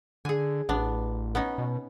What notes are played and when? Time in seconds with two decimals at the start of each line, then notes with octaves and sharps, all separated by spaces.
0.25 D3 G#4 G#5
0.69 A1 B3 D4
1.35 B3 C#4 D#4
1.58 B2